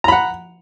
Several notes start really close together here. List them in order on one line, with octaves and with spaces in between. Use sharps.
A#5 B5 F#5